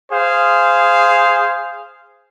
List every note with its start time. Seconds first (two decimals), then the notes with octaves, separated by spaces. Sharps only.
0.11 G#4 C5 F5